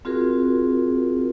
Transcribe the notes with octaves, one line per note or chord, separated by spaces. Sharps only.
C4 F4 F#4 G#4 A#4